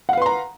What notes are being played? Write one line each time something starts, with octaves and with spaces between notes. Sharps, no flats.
B4 F5 F#5 A#5 C6